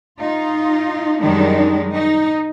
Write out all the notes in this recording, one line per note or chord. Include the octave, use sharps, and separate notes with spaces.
D#4 F4
F#2 D#3 G3 G#3 D4 D#4
D#4